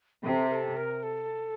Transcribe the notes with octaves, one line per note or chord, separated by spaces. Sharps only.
C3 A4 A#4
A#4
A4
A#4
A4